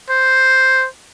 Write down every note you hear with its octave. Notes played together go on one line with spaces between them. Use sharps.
C5